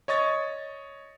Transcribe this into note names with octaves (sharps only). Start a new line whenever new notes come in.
C#5 D#5 C#6 A6